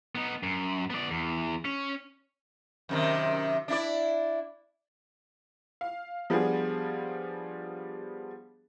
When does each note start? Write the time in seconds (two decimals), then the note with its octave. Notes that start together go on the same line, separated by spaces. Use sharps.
0.15 B3 D#4
0.43 F#2
0.90 B3 D5
1.10 E2
1.65 C#4
2.89 F#2 C3 D#3
3.68 D4 E4 D5
5.81 F5
6.30 F3 G3 B3 D4 G#4